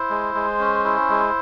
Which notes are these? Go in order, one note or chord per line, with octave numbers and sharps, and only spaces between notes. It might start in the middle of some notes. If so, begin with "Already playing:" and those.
Already playing: E4 C5
G#3
G#3
C#4
E4
G#3